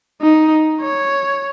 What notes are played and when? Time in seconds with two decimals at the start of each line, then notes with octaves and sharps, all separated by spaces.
0.21 D#4
0.81 C#5